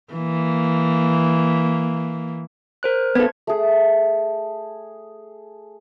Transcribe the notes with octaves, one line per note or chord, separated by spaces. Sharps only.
E3 A#3
A#4 C5 F#6
B3 A4 G#6
A3 G#4